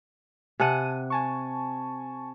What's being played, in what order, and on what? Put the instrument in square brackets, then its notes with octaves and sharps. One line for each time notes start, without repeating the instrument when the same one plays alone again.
[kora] C3 F#5 [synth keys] G#5 A5 D#7
[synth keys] G#5 A5 C#6